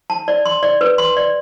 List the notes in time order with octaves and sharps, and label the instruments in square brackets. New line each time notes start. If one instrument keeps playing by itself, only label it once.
[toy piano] A5
D5
C6
D5
B4
C6
D5